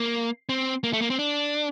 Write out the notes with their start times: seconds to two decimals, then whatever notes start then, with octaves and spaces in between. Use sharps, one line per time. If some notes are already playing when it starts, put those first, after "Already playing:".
Already playing: A#3
0.49 C4
0.84 A#3
0.93 A3
1.01 A#3
1.10 C4
1.19 D4